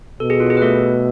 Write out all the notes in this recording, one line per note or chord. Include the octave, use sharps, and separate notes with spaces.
B2 A4
G#4
F4
G#4
B4
A3 A4